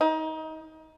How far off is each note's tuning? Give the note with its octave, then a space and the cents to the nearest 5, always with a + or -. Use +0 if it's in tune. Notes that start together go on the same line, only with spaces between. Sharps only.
D#4 +25